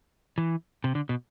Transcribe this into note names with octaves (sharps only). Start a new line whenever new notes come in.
E3
C3
D3
B2